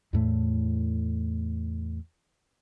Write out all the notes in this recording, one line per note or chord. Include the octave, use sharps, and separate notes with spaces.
E2 A2 A3